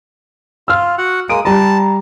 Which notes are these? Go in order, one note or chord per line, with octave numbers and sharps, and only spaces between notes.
F4 E6 F6
F#4 F#5
G#3 A#3 D#6 D7
G3 A5 A#5